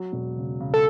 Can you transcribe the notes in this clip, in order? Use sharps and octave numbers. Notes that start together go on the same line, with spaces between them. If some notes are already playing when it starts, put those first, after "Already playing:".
Already playing: F#3
E1
C#3
C#3
A4